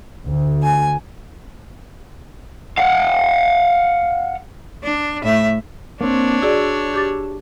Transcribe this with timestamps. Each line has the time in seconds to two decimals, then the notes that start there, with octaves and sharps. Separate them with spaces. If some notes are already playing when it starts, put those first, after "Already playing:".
0.25 D2
0.63 G#5
2.78 F5 F#5
4.83 D4
5.23 A2 E5
6.01 A#3 C4 D4 C#5
6.42 F#4 G#4 D5 E6
6.94 G4 D6 A6